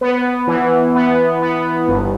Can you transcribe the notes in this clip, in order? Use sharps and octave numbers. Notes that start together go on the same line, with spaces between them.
B3
E3
B3
B3
G1